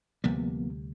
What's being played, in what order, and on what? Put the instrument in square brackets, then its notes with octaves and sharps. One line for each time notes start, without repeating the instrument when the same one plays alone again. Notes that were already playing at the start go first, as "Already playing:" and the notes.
[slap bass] D2 C3 G3 [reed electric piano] F3 A#3 B3